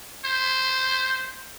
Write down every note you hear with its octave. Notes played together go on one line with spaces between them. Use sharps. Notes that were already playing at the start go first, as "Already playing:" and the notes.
C5